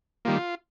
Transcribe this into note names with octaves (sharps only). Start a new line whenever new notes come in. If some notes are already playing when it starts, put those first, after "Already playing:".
D#3 G3 A#3 F4